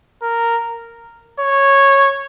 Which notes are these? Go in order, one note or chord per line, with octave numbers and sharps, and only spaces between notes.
A#4
C#5